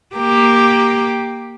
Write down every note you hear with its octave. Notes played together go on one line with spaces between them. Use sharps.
A#3 G4